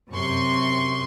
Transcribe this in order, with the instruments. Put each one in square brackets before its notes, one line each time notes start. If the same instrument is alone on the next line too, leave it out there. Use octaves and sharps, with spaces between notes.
[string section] F#2 C3 C6 C#6